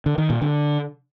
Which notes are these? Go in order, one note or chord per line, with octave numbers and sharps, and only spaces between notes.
D3
D#3
A#2
D3